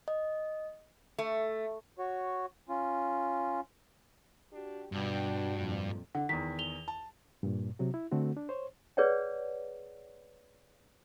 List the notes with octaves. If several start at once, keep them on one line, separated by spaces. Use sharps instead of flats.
D#5
A3
F#4 C#5
C#4 F4
D4 F#4 G4
G2 B2 D4 F#4 G5
F2 A#2
D3 F#5
E2 D#3 B6
F7 G7
A5
G2 A#2
C3 F#3 F#4
E4
D3 A3 C4 F#4
D4
C5 C#5
G#4 B4 C#5 D5 F#5 G5